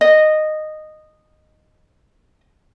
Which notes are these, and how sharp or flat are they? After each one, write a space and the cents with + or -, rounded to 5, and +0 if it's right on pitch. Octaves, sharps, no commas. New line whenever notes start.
D#5 -10